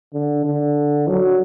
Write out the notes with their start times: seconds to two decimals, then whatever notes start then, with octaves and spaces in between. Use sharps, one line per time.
0.14 D3
0.45 D3
1.08 F#3